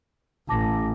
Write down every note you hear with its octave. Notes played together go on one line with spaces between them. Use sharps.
A1 A5 D6 A#6